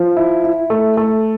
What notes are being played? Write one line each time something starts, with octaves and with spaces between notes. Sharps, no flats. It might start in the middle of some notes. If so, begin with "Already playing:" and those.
Already playing: F3
E4
E4
A3
A3